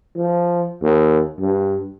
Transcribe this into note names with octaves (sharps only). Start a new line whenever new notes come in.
F3
D#2
G2